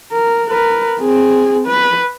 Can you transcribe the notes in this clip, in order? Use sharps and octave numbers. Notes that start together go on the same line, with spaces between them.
A#4
A#4 B4
C4 G#4
B4